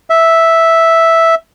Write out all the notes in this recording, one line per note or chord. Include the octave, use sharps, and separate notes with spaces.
E5